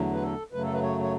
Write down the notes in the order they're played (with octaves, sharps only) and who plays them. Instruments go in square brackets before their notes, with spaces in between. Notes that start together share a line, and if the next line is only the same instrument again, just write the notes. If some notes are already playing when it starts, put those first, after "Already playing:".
Already playing: [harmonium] E2 D3 F#3 A3
B4
A4
F#2 C#3 F#3 A3 B4
A4
B4
C#5
C#5